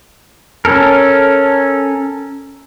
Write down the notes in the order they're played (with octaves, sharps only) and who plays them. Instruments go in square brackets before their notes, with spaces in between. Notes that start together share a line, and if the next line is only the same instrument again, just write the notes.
[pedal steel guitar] C#4 A4 A#4